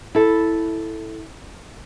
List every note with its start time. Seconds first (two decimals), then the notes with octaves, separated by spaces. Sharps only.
0.15 E4 A4